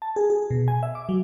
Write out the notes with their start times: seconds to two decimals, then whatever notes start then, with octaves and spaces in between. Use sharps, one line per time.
0.02 A5
0.16 G#4
0.30 G#4
0.50 B2
0.68 G#5
0.83 E5
0.95 D6
1.09 F#3